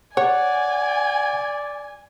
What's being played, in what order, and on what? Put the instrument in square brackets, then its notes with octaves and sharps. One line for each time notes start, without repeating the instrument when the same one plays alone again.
[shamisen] C#5 [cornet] D5 [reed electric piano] F#5 [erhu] G#5